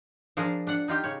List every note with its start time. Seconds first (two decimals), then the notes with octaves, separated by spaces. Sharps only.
0.37 F3 D4 G#4 A#4
0.67 D4 F#5
0.88 D#4 F4 G4 G5
1.04 C#3 C#5